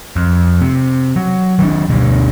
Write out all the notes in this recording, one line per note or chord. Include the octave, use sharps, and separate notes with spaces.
F2
C3
F#3
D#3 F#3 D4
D2 G2 B2